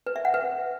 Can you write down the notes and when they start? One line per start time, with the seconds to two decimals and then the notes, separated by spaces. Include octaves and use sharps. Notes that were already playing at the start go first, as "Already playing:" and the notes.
0.06 B4
0.16 E5
0.25 F#5
0.34 B4